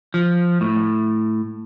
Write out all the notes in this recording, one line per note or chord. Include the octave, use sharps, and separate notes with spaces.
F3
A2